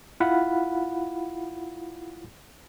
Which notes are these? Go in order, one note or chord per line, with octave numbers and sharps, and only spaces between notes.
E4 F4 F5 F#5 B5